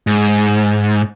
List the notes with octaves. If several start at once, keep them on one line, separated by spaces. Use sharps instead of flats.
G#2